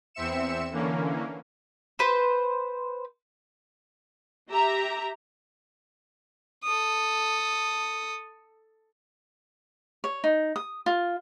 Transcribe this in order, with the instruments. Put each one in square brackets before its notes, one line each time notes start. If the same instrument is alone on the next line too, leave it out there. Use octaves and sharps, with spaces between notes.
[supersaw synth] E2 C4 E5 C#7 E7
D3 E3 A#3 C#4
[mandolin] B4 C5
[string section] G4 E5 A#5
[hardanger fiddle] A4 D#6
[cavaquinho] C#5
D#4
D#6
F4